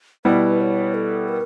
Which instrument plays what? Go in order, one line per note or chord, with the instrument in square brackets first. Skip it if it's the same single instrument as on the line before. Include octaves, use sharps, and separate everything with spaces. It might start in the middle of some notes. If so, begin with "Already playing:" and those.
[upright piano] B2 G3 B3 E4 [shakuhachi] B4
[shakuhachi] C#5
A4
A#4